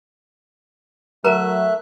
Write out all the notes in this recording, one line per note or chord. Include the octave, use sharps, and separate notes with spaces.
F#3 A3 A#4 E5 A#5 F#6